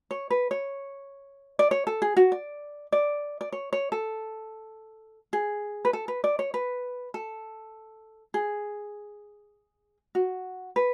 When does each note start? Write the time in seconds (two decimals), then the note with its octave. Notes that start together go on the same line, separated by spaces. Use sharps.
0.11 C#5
0.30 B4
0.51 C#5
1.59 D5
1.71 C#5
1.87 A4
2.02 G#4
2.17 F#4
2.32 D5
2.92 D5
3.41 D5
3.52 C#5
3.73 C#5
3.92 A4
5.33 G#4
5.85 B4
5.93 A4
6.08 B4
6.24 D5
6.39 C#5
6.54 B4
7.14 A4
8.34 G#4
10.15 F#4
10.76 B4